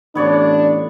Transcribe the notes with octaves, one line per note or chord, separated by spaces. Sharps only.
A1 B3 D4 C#5 D5